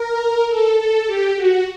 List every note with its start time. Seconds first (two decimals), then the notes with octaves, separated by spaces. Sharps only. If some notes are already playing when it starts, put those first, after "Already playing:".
Already playing: A#4
0.49 A4
0.78 A4
1.07 G4
1.36 F#4